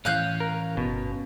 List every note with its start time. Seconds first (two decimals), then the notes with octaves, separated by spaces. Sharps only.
0.05 A2 E3 C#4 F5 F#6 G6
0.40 A#4
0.77 G1 B2